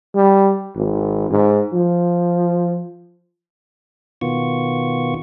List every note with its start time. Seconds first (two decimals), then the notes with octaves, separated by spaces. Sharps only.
0.15 G3
0.75 G#1
1.31 G#2
1.73 F3
4.21 B2 D#3 B3 F4 C#6